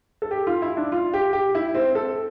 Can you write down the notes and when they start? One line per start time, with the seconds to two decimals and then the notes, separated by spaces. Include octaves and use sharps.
0.22 A4
0.31 G4
0.47 F4
0.62 E4
0.77 D4
0.92 F4
1.14 G4
1.33 G4
1.55 E4
1.75 C4
1.95 A4